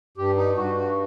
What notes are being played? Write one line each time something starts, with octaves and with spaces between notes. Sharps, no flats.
G2 G4
D#4
G2 F#4
F#4